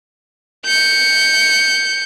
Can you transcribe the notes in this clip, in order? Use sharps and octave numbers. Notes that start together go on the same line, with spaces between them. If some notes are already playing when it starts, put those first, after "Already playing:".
G6 C#7